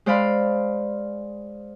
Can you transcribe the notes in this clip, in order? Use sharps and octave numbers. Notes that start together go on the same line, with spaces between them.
G#3 C5 D5 F5 B5